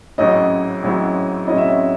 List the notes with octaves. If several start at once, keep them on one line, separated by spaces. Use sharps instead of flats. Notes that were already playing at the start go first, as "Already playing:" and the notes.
A1 G#2 F#3 C#4 E4 D#5
A1 G#2 F#3 C#4 E4
A1 G#2 F#3 C#4 E4 D#5
E5
D#5